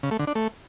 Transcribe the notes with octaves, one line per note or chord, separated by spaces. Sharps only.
C#3
A3
D3
D4
A3